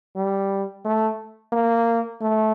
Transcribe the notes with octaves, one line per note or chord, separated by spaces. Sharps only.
G3
A3
A#3
A3